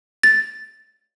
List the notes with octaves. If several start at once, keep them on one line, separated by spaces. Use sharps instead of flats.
A6